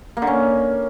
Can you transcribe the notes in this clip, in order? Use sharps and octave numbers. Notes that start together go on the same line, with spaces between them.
A#3
D3
C#4